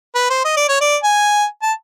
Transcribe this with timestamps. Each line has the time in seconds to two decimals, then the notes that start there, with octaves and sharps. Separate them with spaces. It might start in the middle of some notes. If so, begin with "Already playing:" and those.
0.15 B4
0.30 C5
0.44 D#5
0.57 D5
0.69 C#5
0.81 D5
1.03 G#5
1.62 A5